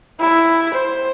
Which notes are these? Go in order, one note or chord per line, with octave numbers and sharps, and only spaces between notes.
E4
C5